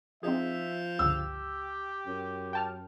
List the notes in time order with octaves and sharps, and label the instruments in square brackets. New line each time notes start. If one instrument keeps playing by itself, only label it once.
[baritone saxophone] F3 [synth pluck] C4 D#4 G#4 [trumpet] E5
[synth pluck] G1 C#2 [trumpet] G4 [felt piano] E6
[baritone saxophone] F#2
[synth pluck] G5 A5 F6